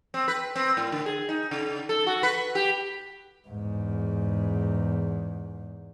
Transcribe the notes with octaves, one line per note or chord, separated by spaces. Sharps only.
C4
B4
C4
A2
D3
G#4
D#4
C#3
A4
F#4
B4
G4
E2 G#2